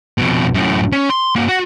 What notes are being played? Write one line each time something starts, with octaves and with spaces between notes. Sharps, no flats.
F2 B2
F#2 A2
C#4
C6
A#3 F#4
F#4